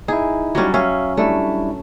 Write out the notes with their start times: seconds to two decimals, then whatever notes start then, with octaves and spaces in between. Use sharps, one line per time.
0.08 D#4 E4 G#4
0.55 F#3 G3 C#4
0.74 C#4 E5 F5
1.17 G3 A3 D4 E4